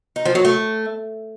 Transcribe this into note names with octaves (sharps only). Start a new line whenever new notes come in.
D#4
F3
F#3
A3